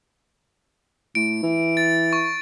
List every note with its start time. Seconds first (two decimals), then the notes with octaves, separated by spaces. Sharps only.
1.15 A2 D7
1.43 E3
1.77 A6
2.13 C#6